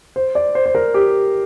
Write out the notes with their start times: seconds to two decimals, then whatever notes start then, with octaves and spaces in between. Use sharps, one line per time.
0.16 C5
0.35 D5
0.55 C5
0.66 C5
0.75 A#4
0.94 G4